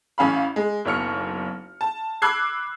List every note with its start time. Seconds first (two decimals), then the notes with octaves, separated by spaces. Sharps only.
0.18 A1 C#4 F5 B5
0.56 G#3
0.85 F#1 B1 C#5 F6 C#7
1.81 A5
2.22 B5 D6 E6 F#6 G#6 C7